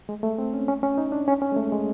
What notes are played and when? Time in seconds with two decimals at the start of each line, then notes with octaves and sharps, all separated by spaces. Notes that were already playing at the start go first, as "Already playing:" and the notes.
0.09 G#3
0.23 A3
0.38 C4
0.53 C#4
0.68 C#4
0.83 C#4
0.98 D#4
1.12 D4
1.28 C#4
1.42 C#4
1.52 G#3
1.56 A3
1.72 G#3